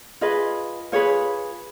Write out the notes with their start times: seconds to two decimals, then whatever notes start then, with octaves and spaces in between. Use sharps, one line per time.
0.21 F4 G#4 B4 D#5
0.92 F4 G#4 B4 C#5